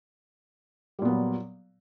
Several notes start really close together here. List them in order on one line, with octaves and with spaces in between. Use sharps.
G3 A#2 B3 F#3